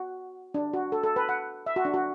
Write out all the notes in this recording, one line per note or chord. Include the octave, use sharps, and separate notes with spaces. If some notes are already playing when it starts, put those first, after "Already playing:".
Already playing: F#4
D4
F#4
A4
A4
B4
F#5
E5
F#4
D4
F#4